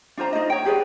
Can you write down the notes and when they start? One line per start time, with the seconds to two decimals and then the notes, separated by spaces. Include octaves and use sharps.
0.17 D4 F4 C5 A#5
0.33 D#4 F4 C5 D#5
0.50 C#5 G5
0.65 G4 G#4 B4 D5